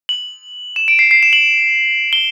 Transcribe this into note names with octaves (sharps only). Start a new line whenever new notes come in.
F#7
E7
D7
C7
C7
E7
F#7
G7